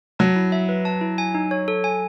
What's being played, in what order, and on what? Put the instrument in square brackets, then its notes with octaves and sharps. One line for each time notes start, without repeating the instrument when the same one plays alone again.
[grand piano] F#3 [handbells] A5
[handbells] E4
E5
B4
A5
E4
G#5
D#4
C#5
A4
G#5